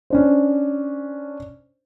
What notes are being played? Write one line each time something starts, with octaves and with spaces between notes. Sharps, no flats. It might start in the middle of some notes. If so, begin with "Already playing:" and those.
C#4 D4 C5